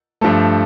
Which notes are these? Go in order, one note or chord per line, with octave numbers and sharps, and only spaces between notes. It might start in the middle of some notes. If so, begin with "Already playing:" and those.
G2 F3 A3